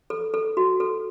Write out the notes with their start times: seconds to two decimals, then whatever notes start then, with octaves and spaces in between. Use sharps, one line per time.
0.10 A4
0.34 A4
0.57 F#4
0.80 A4